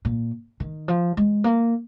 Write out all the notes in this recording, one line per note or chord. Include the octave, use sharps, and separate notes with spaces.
A#2
D#3
F3
G#3
A#3